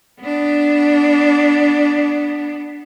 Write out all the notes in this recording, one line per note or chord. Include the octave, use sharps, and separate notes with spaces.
B3 D4